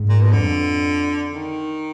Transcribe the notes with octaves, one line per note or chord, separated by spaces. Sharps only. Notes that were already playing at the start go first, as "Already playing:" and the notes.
Already playing: G#2
A#2
B2
F2 D3
D#3